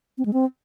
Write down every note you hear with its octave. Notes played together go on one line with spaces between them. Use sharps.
C4
G#3
C4